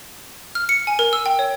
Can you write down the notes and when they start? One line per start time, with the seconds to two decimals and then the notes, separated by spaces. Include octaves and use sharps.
0.55 F6
0.69 C#7
0.87 G#5
0.99 A#4
1.13 E6
1.26 G5
1.39 C#5